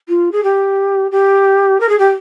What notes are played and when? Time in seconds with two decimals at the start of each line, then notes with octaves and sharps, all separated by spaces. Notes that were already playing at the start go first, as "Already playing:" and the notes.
0.09 F4
0.32 G#4
0.43 G4
1.11 G4
1.80 A#4
1.89 G#4
1.99 G4